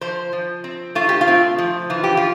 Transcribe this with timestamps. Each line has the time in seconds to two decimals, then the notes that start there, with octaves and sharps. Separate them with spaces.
0.01 F3 C5
0.33 F3
0.64 C4
0.95 A3 F4
1.09 G4
1.21 F4
1.28 C4
1.58 F3
1.90 E3 F4
2.04 G4
2.17 F4